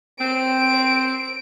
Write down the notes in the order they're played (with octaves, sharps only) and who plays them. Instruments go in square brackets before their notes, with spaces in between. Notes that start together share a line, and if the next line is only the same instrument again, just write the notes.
[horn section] C4 [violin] D7